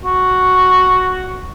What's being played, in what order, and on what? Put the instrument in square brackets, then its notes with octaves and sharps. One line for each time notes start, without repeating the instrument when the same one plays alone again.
[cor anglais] F#4